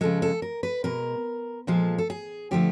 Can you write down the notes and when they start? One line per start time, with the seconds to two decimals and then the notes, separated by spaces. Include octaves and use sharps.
0.01 C#3 F3 G#3 A4
0.22 A4
0.42 A#4
0.63 B4
0.84 B2 G#3 A#4
1.67 A#2 F3 G#3 A4
1.98 A4
2.10 G#4
2.51 D3 F3 A3 G4